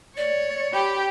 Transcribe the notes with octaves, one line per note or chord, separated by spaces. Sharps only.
C#5 D5
G4 B5